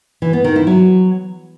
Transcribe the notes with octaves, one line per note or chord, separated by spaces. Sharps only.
E3
B3
D#3
E4
F#3